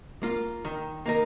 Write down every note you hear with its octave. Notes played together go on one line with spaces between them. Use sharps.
A#3 F4
D#3
A#3 D#4 A#4